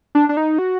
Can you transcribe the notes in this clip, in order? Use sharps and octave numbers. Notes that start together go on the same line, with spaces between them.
D4
D4
D#4
F#4